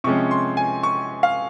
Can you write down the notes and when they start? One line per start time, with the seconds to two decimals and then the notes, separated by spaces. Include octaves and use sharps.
0.04 C3 F3 G#3 C#4 C#6
0.31 C6
0.57 G#5
0.83 C#6
1.23 F5